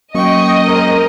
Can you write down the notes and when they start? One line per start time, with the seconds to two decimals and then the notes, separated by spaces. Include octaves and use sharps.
0.15 F#3 A#3 C#4 D#5 G5 C#6
0.66 G#3 C4 A#4